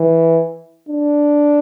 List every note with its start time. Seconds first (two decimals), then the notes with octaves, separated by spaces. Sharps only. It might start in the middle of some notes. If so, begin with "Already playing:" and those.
Already playing: E3
0.89 D4